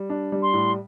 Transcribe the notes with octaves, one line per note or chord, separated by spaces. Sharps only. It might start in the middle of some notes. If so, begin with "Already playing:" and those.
Already playing: G3
D4
G3
C6
A2